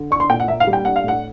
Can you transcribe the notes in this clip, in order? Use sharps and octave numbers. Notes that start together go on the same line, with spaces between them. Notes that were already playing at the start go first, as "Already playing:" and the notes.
Already playing: D3
D4 C#6
C6
A#2 G5
F#5
A#3 E5
F5
G3
G5
D4 F#5
F5
A2 F#5